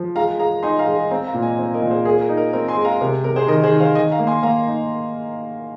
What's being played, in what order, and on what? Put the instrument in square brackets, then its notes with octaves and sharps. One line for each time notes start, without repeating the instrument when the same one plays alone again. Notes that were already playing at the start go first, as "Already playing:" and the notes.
Already playing: [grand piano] F3
[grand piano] G#3 [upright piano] F5 A#5
[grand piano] G#4 [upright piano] F5 A#5
[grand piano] D#4 [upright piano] G#5 C6
[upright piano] F5 A#5
[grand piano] G#3
[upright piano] D#5 G#5
[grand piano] C4 [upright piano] F5 A#5
[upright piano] F5 A#5
[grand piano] A#2
[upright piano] D#5 G#5
[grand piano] C4
[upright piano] A#4 D#5
[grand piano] A#2
[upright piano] G#4 C5
[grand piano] G#4 [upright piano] A#4
[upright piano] A#4
[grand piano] D#4
[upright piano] A#4 D#5
[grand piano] C4 [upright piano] A#4
[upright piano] G#5 C6
[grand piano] G#3
[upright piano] F5 A#5
[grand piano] C3 [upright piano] A#4
[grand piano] C3 [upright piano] A#4
[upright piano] G#4 C5
[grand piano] D#3 [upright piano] A#4 D#5
[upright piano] G#4 C5
[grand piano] D#3
[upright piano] C5 F5
[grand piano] D#3 [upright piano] D#5 G#5
[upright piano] F5 A#5
[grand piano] A#3
[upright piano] G#5 C6
[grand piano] A#3 [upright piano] F5 A#5
[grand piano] D#4